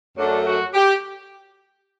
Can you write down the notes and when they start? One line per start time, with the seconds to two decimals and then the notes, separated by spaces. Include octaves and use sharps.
0.17 F#2 F#3 A3 D4
0.46 F#4
0.74 G4